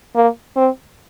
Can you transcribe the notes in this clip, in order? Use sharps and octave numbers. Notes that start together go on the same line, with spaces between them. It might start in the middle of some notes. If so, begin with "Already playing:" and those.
A#3
C4